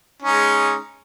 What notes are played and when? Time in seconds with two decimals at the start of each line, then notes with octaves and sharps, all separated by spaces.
0.22 C#4
0.25 D#4
0.28 G#3